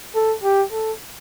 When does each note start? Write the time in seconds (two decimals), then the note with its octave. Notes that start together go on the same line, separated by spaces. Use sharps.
0.15 A4
0.44 G4
0.72 A4